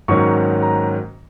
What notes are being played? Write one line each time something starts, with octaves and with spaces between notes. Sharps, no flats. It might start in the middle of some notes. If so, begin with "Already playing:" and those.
G#2 D#3 F#3 A#3 C#4 C#6
A#5